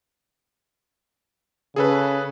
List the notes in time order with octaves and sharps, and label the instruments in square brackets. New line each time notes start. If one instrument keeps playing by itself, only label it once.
[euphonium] C#3 [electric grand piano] G#4 A4 B4